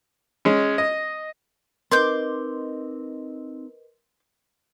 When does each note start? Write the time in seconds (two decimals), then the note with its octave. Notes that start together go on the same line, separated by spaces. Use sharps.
0.45 G#3 C#4
0.78 D#5
1.91 C4 D#4 A#4 B4 D#5 C6 D6 G6